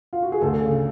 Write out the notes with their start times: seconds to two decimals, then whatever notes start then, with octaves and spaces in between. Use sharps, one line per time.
0.13 F4
0.22 F#4
0.32 G#4
0.41 D2 A4
0.63 C#3